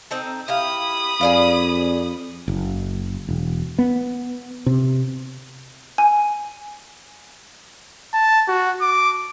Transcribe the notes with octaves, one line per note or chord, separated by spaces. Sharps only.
C4 D#4 A4
E4 G4 F5 B5 D#6
F2 G#4 D5 F5
F#1
E1
B3
C3
G#5
A5
F#4
D6